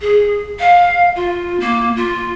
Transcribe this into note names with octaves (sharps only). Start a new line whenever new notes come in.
G#4
F5
F4
A#3
F4